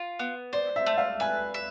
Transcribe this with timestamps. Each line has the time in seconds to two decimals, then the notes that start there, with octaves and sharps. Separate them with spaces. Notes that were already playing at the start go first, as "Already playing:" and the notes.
Already playing: F4
0.19 B3
0.53 C5 D5
0.76 E5
0.86 A3
0.98 F5
1.20 B4 G#5
1.54 E5